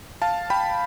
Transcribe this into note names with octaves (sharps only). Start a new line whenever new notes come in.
F5 A5
G5 B5